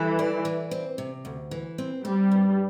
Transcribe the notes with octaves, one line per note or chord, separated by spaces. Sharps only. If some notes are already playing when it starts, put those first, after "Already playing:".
Already playing: E3 G3 A4
D5
E3
C4
C3
D2
E3
C4
G3 C4
G2